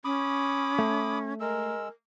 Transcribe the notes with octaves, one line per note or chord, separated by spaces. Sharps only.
C#4 B5 D6 D#6
A3
G#3 A#4 E6